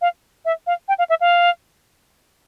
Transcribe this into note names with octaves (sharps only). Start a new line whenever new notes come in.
F5
E5
F5
G5
F5
E5
F5